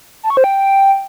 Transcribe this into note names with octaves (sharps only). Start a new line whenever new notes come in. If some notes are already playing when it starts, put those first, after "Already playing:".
A5
C#6
C5
G5